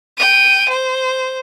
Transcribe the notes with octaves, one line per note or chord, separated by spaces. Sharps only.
G5 D#7
C5